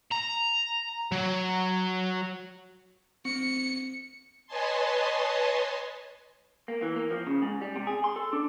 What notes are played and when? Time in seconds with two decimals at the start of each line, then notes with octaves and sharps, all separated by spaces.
0.12 A#5
1.12 F#3
3.25 C4 C#7
4.46 B4 C#5 D#5 G#5 A5 C6
6.68 A#3
6.82 E3
6.96 A#3
7.11 F3
7.27 C#3
7.42 G#2
7.61 G3
7.76 C3
7.87 G#4
8.04 C6
8.16 A4
8.33 D4